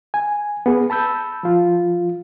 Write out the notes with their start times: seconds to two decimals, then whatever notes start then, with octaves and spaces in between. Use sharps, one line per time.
0.14 G#5
0.66 B3 G#4
0.90 A5 B5 E6 G6
1.43 F3 F4